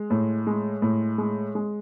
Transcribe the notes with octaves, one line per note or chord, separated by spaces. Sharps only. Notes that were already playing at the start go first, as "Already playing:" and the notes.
Already playing: G#3
A2
G#3
A2
G#3
G#3